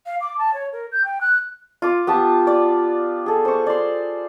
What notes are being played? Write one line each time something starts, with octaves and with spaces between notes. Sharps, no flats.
F5
D6
A5
C#5
A#4
G6
G5
F#6
F4 D6
B3 G4 A5 D6
D5
G#4 A4
C5 C#6
D5 C6